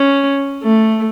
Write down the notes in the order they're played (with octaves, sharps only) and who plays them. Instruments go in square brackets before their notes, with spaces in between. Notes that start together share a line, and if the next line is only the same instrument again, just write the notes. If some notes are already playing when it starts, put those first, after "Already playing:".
Already playing: [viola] C#4
A3